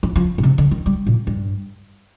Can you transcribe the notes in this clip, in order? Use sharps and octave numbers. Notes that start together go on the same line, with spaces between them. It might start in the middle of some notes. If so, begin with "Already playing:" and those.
F3
F3
A#2
C3
D3
D#3
G3
A#2
G2